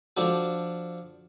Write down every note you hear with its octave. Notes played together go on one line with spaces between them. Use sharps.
F3 D4 F#4 A4